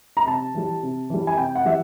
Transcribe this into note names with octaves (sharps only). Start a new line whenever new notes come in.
A#5
C3 A5
E3 G3
C3
E3 G3
G#5
C3 G5
F#5
E3 G3 E5